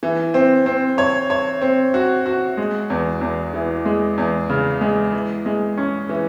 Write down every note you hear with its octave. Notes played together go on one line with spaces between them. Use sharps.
E3
C4
C4
C#5
C#5
C4
F#4
F#4
G#3
E2
E2
E3
G#3
E2
C#3
G#3
E3
G#3
C#4
E3